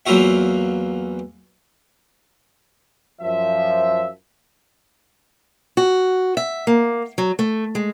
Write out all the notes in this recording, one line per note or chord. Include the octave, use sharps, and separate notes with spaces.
E2 F#3 A#3 F4 F#4 E5
F#2 F3 E5
F#4
E5
A#3
F#3
A3
G#3